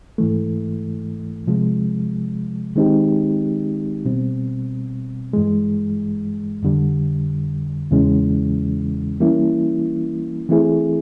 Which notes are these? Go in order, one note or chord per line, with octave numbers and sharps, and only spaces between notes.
G#2 E3 A3
C3 F3 G#3
D#3 G#3 C4 D#4 G4
B2 G3 C4
G2 E3 G#3
F2 D3 G3
E2 C#3 E3 G#3 C#4
E3 G3 A#3 C#4 E4
E3 A3 C4 E4 G#4